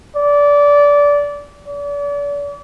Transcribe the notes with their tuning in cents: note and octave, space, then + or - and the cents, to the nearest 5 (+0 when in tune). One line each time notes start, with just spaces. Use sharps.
D5 -20
D5 -40